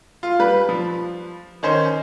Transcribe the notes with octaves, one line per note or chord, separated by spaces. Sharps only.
F4
G3 B4
F3
D#3 C#4 C5